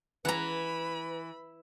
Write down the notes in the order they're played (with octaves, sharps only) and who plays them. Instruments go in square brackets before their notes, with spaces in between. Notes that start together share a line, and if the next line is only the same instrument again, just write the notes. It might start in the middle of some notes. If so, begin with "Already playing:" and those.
[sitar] E3 [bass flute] B4 [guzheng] F#5 A#5 [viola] B5